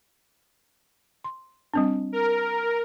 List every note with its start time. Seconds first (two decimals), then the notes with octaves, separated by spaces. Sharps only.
1.24 C6
1.74 G3 C4 D4
2.12 A#4